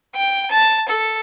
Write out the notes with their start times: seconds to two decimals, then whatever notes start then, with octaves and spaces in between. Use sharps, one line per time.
0.15 G5
0.51 A5
0.89 A4